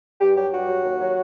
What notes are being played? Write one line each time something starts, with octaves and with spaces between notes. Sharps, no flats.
G2 G4
F#3 G4
G2 F#4
F#3
D#2
F#3